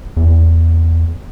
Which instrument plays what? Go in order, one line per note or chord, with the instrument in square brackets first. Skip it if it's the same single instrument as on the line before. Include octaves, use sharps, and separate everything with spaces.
[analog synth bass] E2